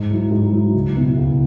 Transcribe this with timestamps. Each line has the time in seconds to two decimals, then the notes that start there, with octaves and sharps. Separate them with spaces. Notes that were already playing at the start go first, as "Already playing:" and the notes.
Already playing: G#2
0.11 F#3 E4
0.31 G#2
0.52 F#3 E4
0.75 C#2
0.96 B2 B3 E4
1.17 C#2